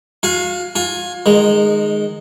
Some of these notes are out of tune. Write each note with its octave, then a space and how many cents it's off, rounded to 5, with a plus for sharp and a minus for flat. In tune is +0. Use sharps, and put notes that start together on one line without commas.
F#4 -35 F5 +10 G#5 +0
F4 +30 G#5 +0
D#3 -25 G#3 +0